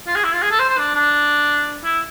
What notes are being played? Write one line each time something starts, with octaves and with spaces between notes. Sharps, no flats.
F4
G#4
E4
F4
G#4
A4
C5
C5
D4
D4
E4